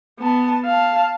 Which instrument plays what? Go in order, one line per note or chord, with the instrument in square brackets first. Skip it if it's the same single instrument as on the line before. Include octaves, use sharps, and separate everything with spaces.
[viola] B3 A5
F5 A5